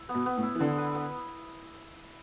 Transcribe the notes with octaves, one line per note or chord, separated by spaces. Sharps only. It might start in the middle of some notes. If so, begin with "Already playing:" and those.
Already playing: E4
B3
B2
B3
A2
E4
E3
D3 B3
B4
B3